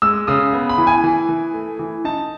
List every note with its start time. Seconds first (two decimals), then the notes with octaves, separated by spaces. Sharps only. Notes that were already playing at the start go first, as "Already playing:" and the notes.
0.02 G#3 E6
0.27 C#3 D#6
0.53 B3
0.69 B5
0.78 E3
0.87 G#5
1.04 E3
1.29 E3
1.54 A3
1.79 E3
2.04 D#4 A5